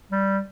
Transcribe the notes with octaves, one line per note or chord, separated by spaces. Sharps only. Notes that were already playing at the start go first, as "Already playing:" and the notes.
G3